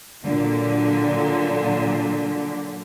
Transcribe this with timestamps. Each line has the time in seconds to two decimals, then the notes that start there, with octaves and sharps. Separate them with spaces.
0.22 A#2 D3 F#3